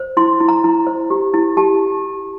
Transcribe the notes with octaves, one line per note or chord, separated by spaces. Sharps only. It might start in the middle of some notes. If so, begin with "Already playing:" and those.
Already playing: C5
E4 C6
E4
A#5
E4
C5
G4
E4
G4 A5